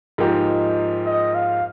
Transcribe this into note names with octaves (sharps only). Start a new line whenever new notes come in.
G#2 F3 A#3 D#4 G4
D#5
F5